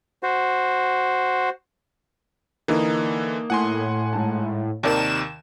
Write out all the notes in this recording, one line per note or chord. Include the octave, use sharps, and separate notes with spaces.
F#4 C5
D3 E3 A#3 D#4
A2 F#5 G#5 C6
G#2 A5
D#2 C3 D#3 A#4 D5 A5 E7